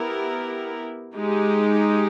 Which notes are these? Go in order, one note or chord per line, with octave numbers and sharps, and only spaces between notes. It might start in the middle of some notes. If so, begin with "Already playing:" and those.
Already playing: B3 E4 G4 A#4
G#3 D#4 G4